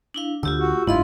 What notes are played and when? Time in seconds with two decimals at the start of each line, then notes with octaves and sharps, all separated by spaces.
0.14 D4 E4 F5
0.43 D2 D3 F4 G4 E6
0.59 F#4
0.87 F#1 G#2 D4 E4 F4 D#5 C6